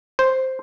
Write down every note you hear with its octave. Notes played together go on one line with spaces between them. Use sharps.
C5